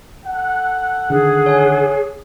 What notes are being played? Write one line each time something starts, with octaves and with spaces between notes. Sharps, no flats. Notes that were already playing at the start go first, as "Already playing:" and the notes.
A4 F#5
D3 D#3 G#4
C#5 G#5